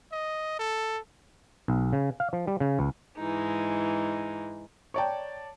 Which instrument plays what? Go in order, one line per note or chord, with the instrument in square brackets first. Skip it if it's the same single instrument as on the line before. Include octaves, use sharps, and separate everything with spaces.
[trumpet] D#5
A4
[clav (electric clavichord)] B1
C#3
F5
F3
G3
C#3
C#2
[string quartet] G#2 E3 G#3 D#4
[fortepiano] C#5 D5 A5 [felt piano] G5 A#5 C#6